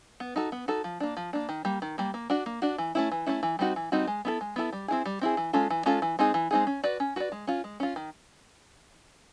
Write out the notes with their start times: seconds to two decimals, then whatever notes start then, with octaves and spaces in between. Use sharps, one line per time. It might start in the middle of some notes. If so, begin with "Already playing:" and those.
0.20 B3
0.36 D#4 F#4 A4
0.52 B3
0.68 D#4 F#4 A4
0.84 F3
1.00 A#3 D4
1.17 F3
1.33 A#3 D4
1.49 D#3
1.65 G3 A#3
1.82 D#3
1.98 G3 A#3
2.14 A#3
2.30 D4 F#4
2.46 A#3
2.62 D4 F#4
2.78 E3
2.95 A3 C#4 E4
3.12 E3
3.26 A3 C#4 E4
3.43 E3
3.59 G3 C4 D#4 F#4
3.76 E3
3.92 G3 C4 D#4 F#4
4.07 G#3
4.25 B3 E4 A4
4.41 G#3
4.56 B3 E4 A4
4.72 G3
4.88 C4 E4 G#4
5.05 G3
5.21 C4 E4 G#4
5.37 E3
5.53 G#3 C#4 F4 A4
5.70 E3
5.86 G#3 C#4 F4 A4
6.02 E3
6.19 G#3 C4 D#4 G#4
6.34 E3
6.51 G#3 C4 D#4 G#4
6.67 C#4
6.83 F#4 B4 D5
7.00 C#4
7.16 F#4 B4 D5
7.32 G#3
7.47 C#4 F4
7.64 G#3
7.80 C#4 F4
7.96 D#3